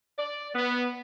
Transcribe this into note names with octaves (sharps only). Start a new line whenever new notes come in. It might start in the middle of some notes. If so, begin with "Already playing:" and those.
D5
B3